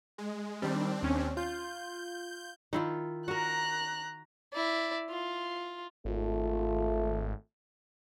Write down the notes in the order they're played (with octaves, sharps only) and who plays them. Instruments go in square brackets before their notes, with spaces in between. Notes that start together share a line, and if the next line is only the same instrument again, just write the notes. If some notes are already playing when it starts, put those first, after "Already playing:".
[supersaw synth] G#3
[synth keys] D#3 G3 [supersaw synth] C4 D4
[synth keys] D#2 C#4
[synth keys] F4 [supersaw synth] G6
[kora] D#3 E4 F4
[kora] F#4 A#4 [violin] A#5 F#6
[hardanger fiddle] E4 D5
F4
[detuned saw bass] G#1 [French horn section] A3 F4